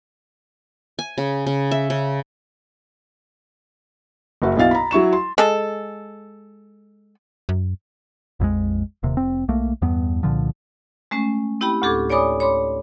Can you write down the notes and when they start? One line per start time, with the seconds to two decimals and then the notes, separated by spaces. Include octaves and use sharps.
0.99 G#5
1.18 C#3
1.46 C#3
1.71 E5
1.90 C#3
4.42 F#1 F#4 E5
4.57 B1 B2 E4 F5 A6
4.71 A#5 B5
4.91 F#3 E4 C#6 E7
5.13 C6
5.38 G#3 A4
7.49 F#2
8.40 A#1 F2 D#3 G#3
9.03 D#1 D#2 C3
9.17 F1 C4
9.48 B1 A3 A#3
9.82 E2 G2 B3
10.23 C2 A#2 D3 F3
11.11 G#3 A3 C#4
11.61 C4 E4 G4 G5 B5
11.82 D2 A2 G4 A4 D6 G#6
12.10 C#5 D5 G#5 B5 D6 D#6
12.40 C#5 B5 C6 D6